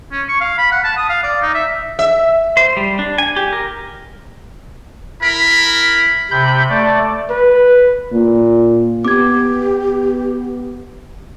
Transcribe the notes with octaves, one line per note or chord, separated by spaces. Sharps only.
C#4
C#6
F5
B5
F#5
A5
D#6
F5
D5
D#4
E5
E5
C5
G3
D4
G#5
G4
A#4
E4 A#4 B5
C3 B5 G6
A3 D5
B4
A#2
B3 G4 D6 G#6